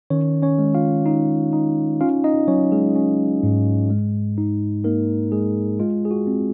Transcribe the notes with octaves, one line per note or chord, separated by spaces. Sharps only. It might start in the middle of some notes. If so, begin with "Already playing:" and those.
D#3 C#4 C#5
C#4 C#5
G#3
F4 F5
D#4
D#4
C#4 F4 F5
D#4 D#5
F#3 C#4 C#5
G#3 G#4
C#4
G#2
G#3
D#4
A#3 D#4 A#4
G#3 G#4
G#3 F4
G#4
F#4
C4